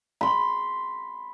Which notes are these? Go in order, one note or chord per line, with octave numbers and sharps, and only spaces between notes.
B5 C6